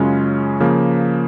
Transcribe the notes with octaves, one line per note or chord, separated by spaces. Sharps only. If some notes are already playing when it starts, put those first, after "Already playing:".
Already playing: F#2 C#3 G#3 C#4 F4
C#3 F3 A#3